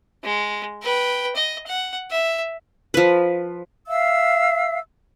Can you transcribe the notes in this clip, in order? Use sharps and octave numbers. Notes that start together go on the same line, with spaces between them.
G#3
B4 G5
D#5
F#5
E5
F3 B4
E5 F5 E6